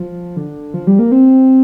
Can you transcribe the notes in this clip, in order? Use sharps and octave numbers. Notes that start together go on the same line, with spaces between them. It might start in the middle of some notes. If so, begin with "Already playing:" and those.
Already playing: F3
D3
F3
G3
A#3
C4